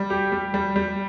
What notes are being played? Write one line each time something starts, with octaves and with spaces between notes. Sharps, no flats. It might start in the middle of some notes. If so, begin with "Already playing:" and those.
Already playing: G3
G4
G3
G3
G3